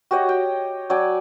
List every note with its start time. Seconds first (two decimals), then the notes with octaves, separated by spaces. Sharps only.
0.11 F#4 G4 C#5 D#5
0.29 G5
0.90 F#3 D5 G5 G#5